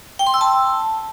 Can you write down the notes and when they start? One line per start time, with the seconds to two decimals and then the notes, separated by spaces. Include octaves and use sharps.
0.19 G5
0.27 C6
0.34 E6
0.41 A5